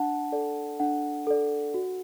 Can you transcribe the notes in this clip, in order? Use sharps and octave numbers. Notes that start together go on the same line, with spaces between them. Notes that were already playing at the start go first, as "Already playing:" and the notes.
Already playing: D4 F#5 A5
A4 D5
D4 F#5
A4 D5
F#4